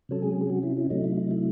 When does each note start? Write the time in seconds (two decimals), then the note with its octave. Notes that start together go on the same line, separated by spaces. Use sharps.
0.09 C3 F#3 C#4 A4
0.22 G#3 G#4
0.41 G#4
0.50 F#3 F#4
0.63 E4
0.77 E4
0.90 C3 F#3 A3 D#4
1.04 E4
1.18 D#4
1.31 E4